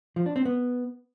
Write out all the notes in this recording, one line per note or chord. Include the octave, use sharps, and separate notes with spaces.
F3
D4
C4
B3